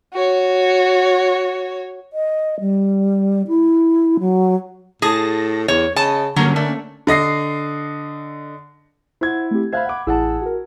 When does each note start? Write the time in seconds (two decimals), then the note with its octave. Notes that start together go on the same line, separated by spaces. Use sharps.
0.14 F#4 C#5
2.13 D#5
2.60 G3
3.48 E4
4.20 F#3
5.02 A2 G#4 A5 A#6
5.68 E2 C#5
5.96 C#3 D#5 A5
6.36 G2 D3 F#3 A#3 C#4
6.56 A3 D4
7.07 D3 D#5 A#6 C7
9.21 E4 C5 F#5 G#6
9.51 A3 C4 G4
9.72 C5 E5 F5 B5 F#6 G#6
9.85 F#5 D6
10.07 A1 E4 G#4 F#5 A5 E6
10.42 F#4 A#4